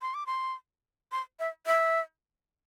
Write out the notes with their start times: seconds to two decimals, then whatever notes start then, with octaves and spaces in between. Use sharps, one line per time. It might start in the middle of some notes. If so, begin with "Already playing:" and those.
0.02 C6
0.14 D6
0.27 C6
1.12 C6
1.39 E5
1.66 E5